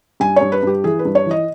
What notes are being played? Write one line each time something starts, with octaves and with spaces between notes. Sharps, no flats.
G2 G#5
G2 C#5
B4
G2 G4
E3 G#4
B4
G2
C#5
E3 D#5